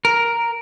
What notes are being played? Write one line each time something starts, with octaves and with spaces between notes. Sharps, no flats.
A#4